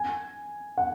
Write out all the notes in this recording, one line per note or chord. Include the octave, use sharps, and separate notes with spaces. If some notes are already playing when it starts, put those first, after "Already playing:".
Already playing: G#5
F#5